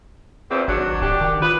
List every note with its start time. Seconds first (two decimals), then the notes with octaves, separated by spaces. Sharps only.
0.51 E2 A#2 C4
0.68 G#1 F#3 D4
1.02 D1 D4 G4
1.21 D#3
1.42 F4 B4